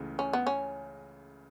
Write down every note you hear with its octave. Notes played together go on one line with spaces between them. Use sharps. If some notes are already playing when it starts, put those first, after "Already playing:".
Already playing: C#2 C#3 E3 A3
C#4
B3
C#4